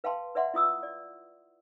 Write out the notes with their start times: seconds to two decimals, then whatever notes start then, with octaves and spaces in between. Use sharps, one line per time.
0.04 B4 F5 G5 A5 C6
0.35 B4 D5 E5 F#5 C6
0.54 E4 F4 D#6 E6
0.83 D5